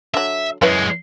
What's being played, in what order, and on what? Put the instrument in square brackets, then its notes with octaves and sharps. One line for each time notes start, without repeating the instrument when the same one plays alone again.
[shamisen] D3 F#3 [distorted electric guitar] E5
[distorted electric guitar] F#2 G#3 [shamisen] E4 B4 C#5